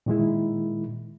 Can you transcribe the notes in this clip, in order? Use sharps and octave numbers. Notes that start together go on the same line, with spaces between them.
A#2 D#3 G#3 E4